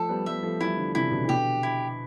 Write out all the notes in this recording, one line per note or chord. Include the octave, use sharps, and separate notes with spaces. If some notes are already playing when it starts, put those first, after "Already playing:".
Already playing: F3 A3 A4
G3 B3
G3 B3 E5
F3 A3
E3 G3 E4
D3 F3
C3 E3 E4
B2 D3
E3
B2 D3 G4
E4